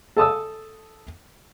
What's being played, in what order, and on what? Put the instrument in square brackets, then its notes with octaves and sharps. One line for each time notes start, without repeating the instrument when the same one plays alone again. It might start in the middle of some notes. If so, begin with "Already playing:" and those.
[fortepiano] A4 A5 D#6 E6